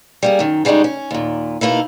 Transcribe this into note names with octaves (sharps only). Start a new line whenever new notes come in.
G3 A#3 G#4
F#2 D#3
C#3 G3 G#3 D#4 F#4
C#4
D#2 A#2
B2 A#3 D#4 E4